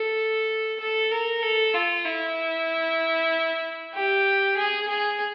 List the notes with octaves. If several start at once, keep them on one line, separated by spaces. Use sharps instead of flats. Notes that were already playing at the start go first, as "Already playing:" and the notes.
Already playing: A4
A4
A#4
A4
F4
E4
G4
G#4
G#4